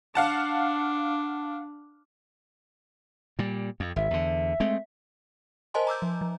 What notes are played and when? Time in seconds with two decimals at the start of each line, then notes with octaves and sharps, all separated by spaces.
0.15 D4 F5 F#5 A5
3.39 A#2 G3
3.80 F2
3.96 G#1 E5
4.11 E2 D3
4.60 G#3 A3 C4
5.74 A#4 C5 D#5 G#5 A5 C6
5.87 A#5 D6 E6 G6
6.02 F3
6.21 F3